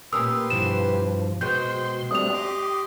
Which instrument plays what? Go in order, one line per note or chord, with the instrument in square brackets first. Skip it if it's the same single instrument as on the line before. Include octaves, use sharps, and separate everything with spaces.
[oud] A#2 C#4 A#4 [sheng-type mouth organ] G4 B4 C6 [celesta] D#6 E6
[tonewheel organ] G2 F3 [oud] B2 E3 [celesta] E7
[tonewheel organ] B2 C6 [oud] F#3 G#3 B3 [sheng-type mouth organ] C5 G5 [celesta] G6
[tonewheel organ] G3 A3 C4 [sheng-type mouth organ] D4 F#6 [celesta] D#6 F7
[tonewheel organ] G4 [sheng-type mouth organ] D#5 C6 D6